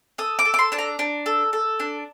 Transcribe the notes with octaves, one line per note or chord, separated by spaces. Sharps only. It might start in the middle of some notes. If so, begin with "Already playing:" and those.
A4 D#6
D6
A4
D6
C6
D4 A5
A#5
D4
A4
A4
D4